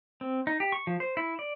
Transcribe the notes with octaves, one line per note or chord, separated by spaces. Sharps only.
C4
D#4
G4
C#6
F3
C5
E4
D5